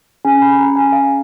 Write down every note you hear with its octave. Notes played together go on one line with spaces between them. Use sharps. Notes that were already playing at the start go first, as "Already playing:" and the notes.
C#4 G#4 G#5
B5
A#5
G#5
F5